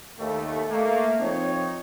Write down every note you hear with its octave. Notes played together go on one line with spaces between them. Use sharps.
D#2 A3
A3 A#3
F3 C4 D#4 C#5